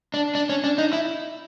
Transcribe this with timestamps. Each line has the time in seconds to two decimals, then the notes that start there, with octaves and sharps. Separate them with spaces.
0.14 D4
0.35 D4
0.49 C#4
0.64 D4
0.78 D#4
0.93 E4